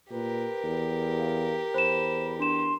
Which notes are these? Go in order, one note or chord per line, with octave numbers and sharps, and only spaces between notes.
A#2 G4 A#4 B4
E2
F5
E2 C5 B5 E7
D4 C6 E7